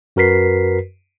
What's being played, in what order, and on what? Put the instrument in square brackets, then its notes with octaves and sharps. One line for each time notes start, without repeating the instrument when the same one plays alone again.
[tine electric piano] F#2 F#4 A#4 B4 B6 C7